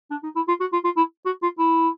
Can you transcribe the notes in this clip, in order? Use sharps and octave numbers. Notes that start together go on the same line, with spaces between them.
D4
D#4
E4
F4
F#4
F4
F4
E4
F#4
F4
E4